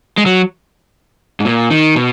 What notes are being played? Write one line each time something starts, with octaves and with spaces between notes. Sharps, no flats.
G#3
F#3
G#2
A#2
D#3
B2